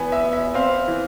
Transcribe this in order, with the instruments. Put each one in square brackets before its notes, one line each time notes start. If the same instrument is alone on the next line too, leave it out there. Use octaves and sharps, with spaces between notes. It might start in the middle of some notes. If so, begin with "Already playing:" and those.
Already playing: [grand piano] E3 B3 G#5
E5
B3
E5
C4 F5
E3